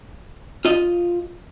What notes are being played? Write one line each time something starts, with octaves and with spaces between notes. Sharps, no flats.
F4 D#5